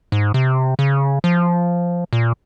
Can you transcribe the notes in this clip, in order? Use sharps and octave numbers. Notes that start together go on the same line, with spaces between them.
G#2
C3
C#3
F3
A#2